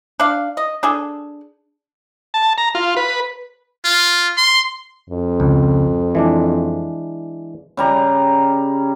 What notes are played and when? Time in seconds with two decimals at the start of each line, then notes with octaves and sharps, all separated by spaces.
0.20 D4 F5
0.57 D#5
0.83 D4 G#4 A4
2.34 A5
2.58 A#5
2.75 F4
2.97 B4
3.85 F4
4.37 C6
5.10 F2
5.40 C#2
6.15 E3 G#3 D4
7.77 C#3 G3 A#5